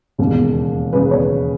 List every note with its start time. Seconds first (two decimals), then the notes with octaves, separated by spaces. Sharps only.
0.18 E1 D#2 C#3
0.93 E1 D#2 C#3 B4
1.11 C#5